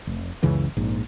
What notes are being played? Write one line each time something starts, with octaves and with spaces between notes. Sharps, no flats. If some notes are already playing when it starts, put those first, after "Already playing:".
F1
C#2 F#2 C#3 E3
A#1 G#2